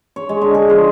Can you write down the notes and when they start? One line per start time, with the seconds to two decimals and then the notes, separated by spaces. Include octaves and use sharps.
0.16 C#5
0.29 G#3
0.41 D3
0.55 G#4
0.70 F3